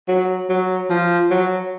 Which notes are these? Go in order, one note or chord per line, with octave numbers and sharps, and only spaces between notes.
F#3
F#3
F3
F#3